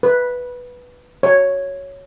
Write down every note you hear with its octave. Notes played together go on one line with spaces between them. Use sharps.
B4
C#5